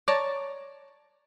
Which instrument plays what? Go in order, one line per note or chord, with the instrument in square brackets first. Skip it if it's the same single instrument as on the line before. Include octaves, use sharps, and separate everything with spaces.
[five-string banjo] C#5 D5 A5 A#5